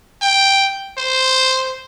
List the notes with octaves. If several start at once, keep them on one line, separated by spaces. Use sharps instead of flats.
G5
C5